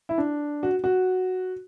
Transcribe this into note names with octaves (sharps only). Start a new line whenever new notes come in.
E4
D4
F#4
F#4